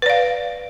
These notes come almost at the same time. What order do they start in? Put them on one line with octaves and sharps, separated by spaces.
B4 D5 F5